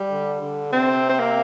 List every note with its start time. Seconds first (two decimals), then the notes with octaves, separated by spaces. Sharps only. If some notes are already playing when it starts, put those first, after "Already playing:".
Already playing: G3
0.10 D3
0.42 D3
0.72 C3 C4
1.09 C4
1.20 A#3